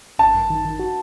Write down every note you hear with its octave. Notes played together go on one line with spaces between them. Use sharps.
G#1 A5
F#2
D#3
D#3
F#4